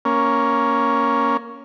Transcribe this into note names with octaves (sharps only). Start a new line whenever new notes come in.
A#3 C#4